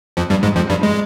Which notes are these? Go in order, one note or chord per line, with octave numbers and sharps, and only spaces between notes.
F2 F3
G2 G3
G#2 G#3
F2 F3
G2 G3
G#3